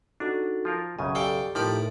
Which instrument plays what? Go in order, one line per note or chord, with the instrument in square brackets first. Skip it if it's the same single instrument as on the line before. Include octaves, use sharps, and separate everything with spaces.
[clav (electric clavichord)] D4 [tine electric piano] D#4 F#4 A4
[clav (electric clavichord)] F3 F4 A#4
[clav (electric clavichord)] B1 F#2 C#3 [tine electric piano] G#5
[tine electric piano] G4 D5 D6 [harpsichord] A4 F5 G5
[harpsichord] A2 D5 B5 [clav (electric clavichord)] F3 [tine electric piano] D#4 G4 A#4